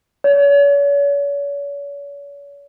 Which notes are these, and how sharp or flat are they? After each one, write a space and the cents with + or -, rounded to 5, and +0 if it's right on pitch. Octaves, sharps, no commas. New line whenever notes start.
C#5 +40